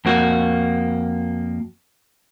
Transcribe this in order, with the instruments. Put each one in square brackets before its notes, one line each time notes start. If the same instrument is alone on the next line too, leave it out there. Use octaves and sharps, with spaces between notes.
[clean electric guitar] F2 A#3 F#4